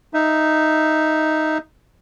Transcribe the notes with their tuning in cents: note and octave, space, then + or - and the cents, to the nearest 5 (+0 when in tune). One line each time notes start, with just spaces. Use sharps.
D#4 +0 E5 +0